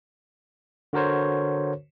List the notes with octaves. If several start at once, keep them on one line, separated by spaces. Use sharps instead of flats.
D3 F#4 A#4 C5 C#5